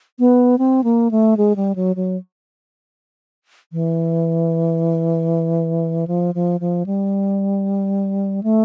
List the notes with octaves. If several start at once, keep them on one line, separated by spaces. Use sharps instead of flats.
B3
C4
A#3
A3
G#3
G3
F#3
F#3
E3
F3
F3
F3
G3
A3